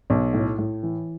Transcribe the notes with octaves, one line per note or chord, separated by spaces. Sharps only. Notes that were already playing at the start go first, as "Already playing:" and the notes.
B1
A2
A2
E3